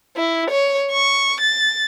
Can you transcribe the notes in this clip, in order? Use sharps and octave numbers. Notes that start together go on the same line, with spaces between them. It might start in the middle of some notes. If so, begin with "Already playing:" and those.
E4
C#5
C#6
A6